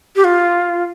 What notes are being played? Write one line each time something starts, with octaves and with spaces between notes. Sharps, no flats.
G4
F4